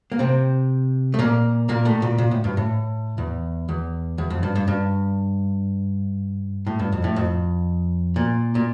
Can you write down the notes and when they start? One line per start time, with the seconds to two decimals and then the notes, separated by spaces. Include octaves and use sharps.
0.12 A#3
0.19 C3 C4
1.14 A3
1.19 A#2 A#3
1.69 A#2 A#3
1.85 A2 A3
2.02 A#2
2.18 A#2
2.31 A2
2.44 G2
2.57 A2
3.18 E2
3.69 E2
4.18 E2
4.30 F2
4.43 G2
4.56 G2
4.68 G2
6.67 A2
6.79 G2
6.92 F2
7.04 A2
7.16 F2
8.16 A#2
8.55 A#2